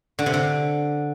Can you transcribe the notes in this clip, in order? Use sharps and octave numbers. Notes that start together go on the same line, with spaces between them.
D3
C3
D3